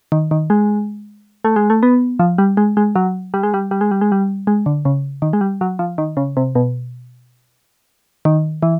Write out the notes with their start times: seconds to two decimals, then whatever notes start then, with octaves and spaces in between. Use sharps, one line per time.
0.12 D#3
0.31 D#3
0.50 G#3
1.45 A3
1.56 G#3
1.70 A3
1.83 B3
2.19 F3
2.38 G3
2.57 G#3
2.77 G#3
2.95 F#3
3.34 G3
3.43 G#3
3.54 G3
3.71 G3
3.81 G#3
3.91 G3
4.01 G#3
4.12 G3
4.47 G#3
4.66 D3
4.85 C#3
5.22 D#3
5.33 G#3
5.41 G3
5.61 F#3
5.79 F3
5.98 D#3
6.17 C#3
6.37 C3
6.55 B2
8.25 D#3
8.63 E3